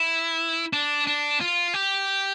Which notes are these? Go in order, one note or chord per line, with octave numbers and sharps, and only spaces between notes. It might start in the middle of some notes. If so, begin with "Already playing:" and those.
Already playing: E4
D4
D4
F4
G4